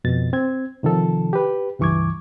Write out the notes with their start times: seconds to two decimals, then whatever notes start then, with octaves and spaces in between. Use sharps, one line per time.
0.04 F2 B2 A6
0.33 C4 G#6
0.83 C3 D#3 F3 A4
1.33 G4 B4
1.79 C#2 G2 E3 C#6 D6 G#6